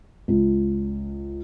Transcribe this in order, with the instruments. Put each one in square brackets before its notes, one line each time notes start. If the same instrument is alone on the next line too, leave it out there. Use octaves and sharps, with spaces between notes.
[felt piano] C#2